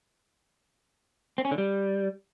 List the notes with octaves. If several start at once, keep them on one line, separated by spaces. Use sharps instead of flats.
C4
C#4
D3
G3